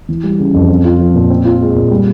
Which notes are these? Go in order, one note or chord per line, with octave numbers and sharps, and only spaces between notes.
E3
G3
C#3
F2
C4
F4
F3
A#2
C4
F4
G#3
A#2
G3